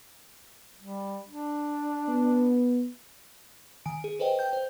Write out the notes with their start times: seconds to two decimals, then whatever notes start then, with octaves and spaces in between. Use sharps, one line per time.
0.81 G3
1.29 D4
2.08 B3
3.86 D#3 G#5 D7
4.04 G#4
4.19 A4 B4 C5 D#5 G5
4.39 G5 G6
4.53 C5